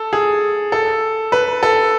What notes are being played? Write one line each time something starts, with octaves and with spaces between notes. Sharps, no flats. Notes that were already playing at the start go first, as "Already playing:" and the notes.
Already playing: A4
G#4
A4
B4
A4